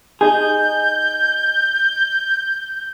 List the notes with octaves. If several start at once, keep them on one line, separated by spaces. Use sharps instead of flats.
D#4 G#4 G6